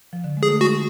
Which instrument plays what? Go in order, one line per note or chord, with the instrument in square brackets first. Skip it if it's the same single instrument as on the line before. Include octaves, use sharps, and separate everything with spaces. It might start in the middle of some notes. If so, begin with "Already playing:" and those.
[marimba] F3
D3
G#3
[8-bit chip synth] G#4
[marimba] A3
[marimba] G#3 [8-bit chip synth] F#4